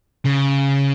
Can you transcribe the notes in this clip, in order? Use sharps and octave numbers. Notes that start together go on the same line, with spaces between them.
C#3